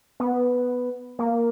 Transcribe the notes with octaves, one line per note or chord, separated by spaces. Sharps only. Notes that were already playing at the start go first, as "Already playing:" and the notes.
B3
A#3